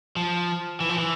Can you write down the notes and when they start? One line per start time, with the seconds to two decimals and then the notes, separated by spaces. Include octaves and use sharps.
0.16 F3
0.80 E3
0.89 F3
0.98 E3